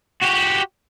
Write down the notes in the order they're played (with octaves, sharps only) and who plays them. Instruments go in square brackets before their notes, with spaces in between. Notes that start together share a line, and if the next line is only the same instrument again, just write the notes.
[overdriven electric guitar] F#4 G4